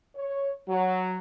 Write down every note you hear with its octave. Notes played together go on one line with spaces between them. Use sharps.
C#5
F#3